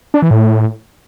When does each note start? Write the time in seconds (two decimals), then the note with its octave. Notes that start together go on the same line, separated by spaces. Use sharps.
0.14 D4
0.22 E3
0.31 A2